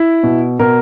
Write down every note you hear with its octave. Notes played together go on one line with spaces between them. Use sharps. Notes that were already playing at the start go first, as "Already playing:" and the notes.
Already playing: E4
B2
B2 A#4